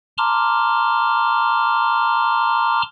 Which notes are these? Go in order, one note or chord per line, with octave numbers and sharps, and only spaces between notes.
A5 A#5 C6 D6 F6